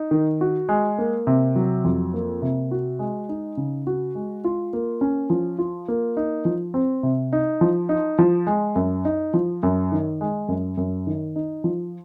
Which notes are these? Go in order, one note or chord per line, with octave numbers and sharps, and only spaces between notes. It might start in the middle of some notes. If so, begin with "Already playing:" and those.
Already playing: D#4
D#3
F#4
G#3
A#3
C3
F#3
F2
A#3
C3
F#4
G#3
D#4
C#3
F#4
G#3
F4
A#3
C#4
F3
F4
A#3
D#4
F3
C4
C3
D#4
F3
D#4
F3
G#3
F#2
D#4
F3
F#2
D#3
G#3
F#2
F#2
D#3
D#4
F3